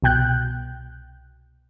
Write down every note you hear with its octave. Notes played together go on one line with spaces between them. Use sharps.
C2 B2 G5 F#6 G6